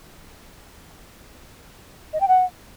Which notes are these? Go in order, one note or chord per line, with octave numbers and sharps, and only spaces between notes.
D#5
G5
F#5